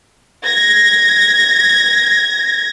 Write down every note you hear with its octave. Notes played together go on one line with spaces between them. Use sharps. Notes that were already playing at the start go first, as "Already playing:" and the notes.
G#6 A#6